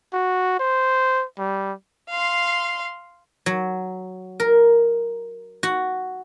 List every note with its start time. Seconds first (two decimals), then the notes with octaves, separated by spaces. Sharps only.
0.13 F#4
0.60 C5
1.38 G3
2.10 F5 C6
3.46 F#3
4.40 A#4
5.63 F#4